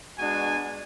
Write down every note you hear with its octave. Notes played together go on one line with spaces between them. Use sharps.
G#3 B3 D4 F#4 G#5